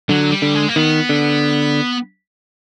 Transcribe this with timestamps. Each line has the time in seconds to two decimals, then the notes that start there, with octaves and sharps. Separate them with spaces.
0.09 D3 F#3
0.30 G3
0.42 D3
0.54 G#3
0.68 A#3
0.76 D#3 B3
1.09 D3